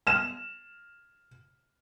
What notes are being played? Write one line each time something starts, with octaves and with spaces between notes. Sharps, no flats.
F6 E7